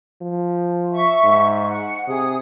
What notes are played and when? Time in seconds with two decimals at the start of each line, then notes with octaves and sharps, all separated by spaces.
0.21 F3
0.92 E5 C#6
1.24 G#2
1.66 F#5
2.08 C3 G#4 D#6